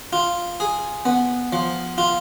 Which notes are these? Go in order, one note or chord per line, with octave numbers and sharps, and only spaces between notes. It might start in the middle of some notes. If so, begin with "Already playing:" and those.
F4
G#4
B3
F3
F4